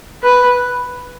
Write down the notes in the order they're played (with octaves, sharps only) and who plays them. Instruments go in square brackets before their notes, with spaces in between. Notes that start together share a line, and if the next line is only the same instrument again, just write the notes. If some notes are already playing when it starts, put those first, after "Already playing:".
[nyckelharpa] B4